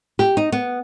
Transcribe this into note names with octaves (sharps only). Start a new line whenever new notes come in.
G4
D#4
B3